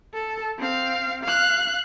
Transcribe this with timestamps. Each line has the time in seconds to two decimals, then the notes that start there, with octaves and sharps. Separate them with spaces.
0.14 A4
0.58 C4 F5
1.23 F5 F#6